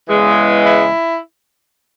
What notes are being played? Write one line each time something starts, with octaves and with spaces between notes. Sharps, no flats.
E2 C#3 E3 G#3
E4